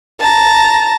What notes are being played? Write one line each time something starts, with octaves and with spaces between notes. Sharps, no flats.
A5 A#5